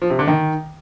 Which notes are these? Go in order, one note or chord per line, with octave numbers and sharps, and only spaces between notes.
F3
C3
D3
D#3